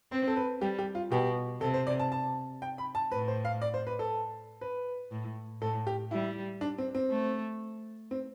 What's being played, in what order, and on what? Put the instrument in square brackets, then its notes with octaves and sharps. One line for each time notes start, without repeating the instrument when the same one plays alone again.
[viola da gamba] C4 [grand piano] C5
[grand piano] A4
B4
[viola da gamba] G3 [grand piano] G4
[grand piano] G4
F4
[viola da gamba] B2 [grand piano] G4
[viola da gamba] C3 [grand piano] A4
[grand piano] C5
D5
A5
A5
G5
B5
A5
[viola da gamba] A2 [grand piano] B4
[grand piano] C5
F5
D5
C5
B4
A4
B4
[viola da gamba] A2
[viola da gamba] A2 [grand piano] A4
[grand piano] G4
[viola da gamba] G3 [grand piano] E4
[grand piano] D4
C4
C4
[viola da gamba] A3
[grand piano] C4